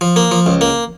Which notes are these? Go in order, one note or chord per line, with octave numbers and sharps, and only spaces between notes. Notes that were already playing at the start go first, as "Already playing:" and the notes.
F3
A#3
F3
C#2
A#3